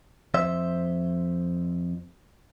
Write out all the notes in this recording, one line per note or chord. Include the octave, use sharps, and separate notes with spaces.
F2 C5 E5